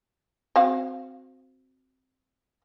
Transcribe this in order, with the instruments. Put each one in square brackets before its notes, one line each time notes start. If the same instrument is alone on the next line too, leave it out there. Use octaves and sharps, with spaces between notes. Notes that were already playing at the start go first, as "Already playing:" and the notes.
[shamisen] C4 F#4 F5